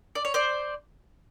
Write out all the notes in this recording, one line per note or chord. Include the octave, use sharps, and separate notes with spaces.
D5
C#5
C5 D5